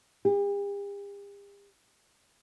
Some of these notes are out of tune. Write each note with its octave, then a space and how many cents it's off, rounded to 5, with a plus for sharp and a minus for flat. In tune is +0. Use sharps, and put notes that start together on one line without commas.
G4 +45